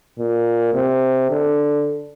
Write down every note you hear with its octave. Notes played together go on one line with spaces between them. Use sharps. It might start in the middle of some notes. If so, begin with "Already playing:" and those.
A#2
C3
D3